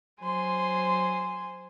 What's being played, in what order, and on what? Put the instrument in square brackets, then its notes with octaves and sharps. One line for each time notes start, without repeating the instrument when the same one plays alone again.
[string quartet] F#3 C5 G#5 C6